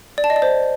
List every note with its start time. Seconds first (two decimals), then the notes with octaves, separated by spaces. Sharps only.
0.18 D5
0.24 A5
0.30 D#5
0.36 D5
0.42 C5